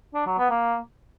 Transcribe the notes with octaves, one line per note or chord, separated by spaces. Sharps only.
D4
F#3
B3
A#3